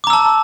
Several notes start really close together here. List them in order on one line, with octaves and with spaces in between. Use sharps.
D6 A#5 E6 A5